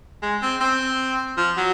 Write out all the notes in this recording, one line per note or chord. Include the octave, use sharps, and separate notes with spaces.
G#3
C4
C4
F3
F#3